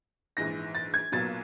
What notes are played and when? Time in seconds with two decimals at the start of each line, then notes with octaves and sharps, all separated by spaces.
0.37 A#1 G#2 E3 A#6
0.75 A6
0.94 G#6
1.12 B1 A#2 F#3 B3 A6